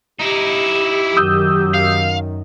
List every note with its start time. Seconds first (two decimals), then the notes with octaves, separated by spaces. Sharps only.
0.20 D#4 E4 G4
1.17 F#2 D#3 D#6 E6 G6
1.74 F5